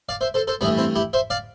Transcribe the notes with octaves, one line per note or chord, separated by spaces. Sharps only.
D5 F5
C5 E5
A4 C5
A4 C5
G2 E3 A3 B3 D4
C4 E4
E4 G4
C5 E5
D5 F5